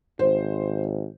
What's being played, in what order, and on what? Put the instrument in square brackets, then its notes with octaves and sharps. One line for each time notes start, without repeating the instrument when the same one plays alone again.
[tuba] G#1 [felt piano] C5